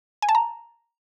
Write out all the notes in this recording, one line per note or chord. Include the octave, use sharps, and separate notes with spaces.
G#5
A5
A#5